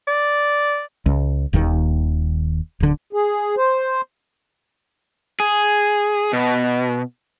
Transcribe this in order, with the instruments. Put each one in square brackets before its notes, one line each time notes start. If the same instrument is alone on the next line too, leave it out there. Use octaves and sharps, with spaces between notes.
[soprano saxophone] D5
[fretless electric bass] C#2
D#1 D#2 G#2 D#3
D1 D3
[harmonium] G#4
C5
[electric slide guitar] G#4
B2